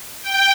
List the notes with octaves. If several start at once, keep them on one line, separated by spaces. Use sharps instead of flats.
G5